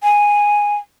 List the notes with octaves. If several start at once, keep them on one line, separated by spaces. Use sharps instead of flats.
G#5